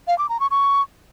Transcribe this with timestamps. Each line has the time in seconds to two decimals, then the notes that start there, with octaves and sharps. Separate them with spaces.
0.08 F5
0.19 D6
0.29 A#5
0.40 C#6
0.51 C#6